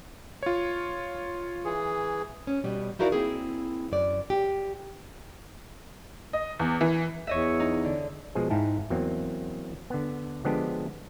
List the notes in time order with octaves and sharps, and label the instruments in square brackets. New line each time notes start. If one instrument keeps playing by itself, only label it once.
[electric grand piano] F4 C#5
[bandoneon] E3 G#4
[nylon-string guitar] C#4
B2 G3
D#4 E4 F#4 A#4 D5 F5
A#3 C4 E4 G#4
F#2 D5
G4
[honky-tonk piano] D#5
E2
E3
[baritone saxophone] E2 [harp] C#5 D#5 E5
[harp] D#4
D3
[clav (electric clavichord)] B2 F3 G#3 G#4
G#2 D#4 E4 F5 G5 A5
E2 F#3 A#3 C4
D3 B3
D3 F3 G#3 B3 D4 G4